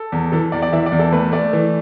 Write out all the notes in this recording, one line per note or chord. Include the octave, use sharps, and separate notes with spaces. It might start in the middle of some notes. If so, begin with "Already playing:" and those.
Already playing: A4
E2
E3 A4
E2 D5
D5
E3 E5
D5
E2
A4
A3 B4
A3 D5
E3